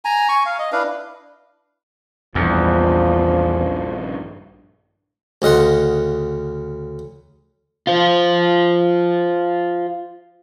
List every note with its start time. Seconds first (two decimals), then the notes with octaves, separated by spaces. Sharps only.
0.05 G#5 A#5
0.29 G#5 C#6
0.46 F5
0.59 D#5
0.72 D4 E4 B4 F5
2.35 A#1 E2 G2 F3
5.42 D2 C#3 D#5 F#5 C6
7.87 F4 C5